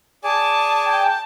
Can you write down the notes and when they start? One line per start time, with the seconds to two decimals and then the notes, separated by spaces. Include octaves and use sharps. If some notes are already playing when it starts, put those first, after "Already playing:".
0.24 G#4 D5 G#5 A5
0.86 G5